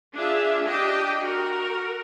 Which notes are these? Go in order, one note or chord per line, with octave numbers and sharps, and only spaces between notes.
D4 F4 G#4 E5
D4 G4 D#5 G5
F#4 A#4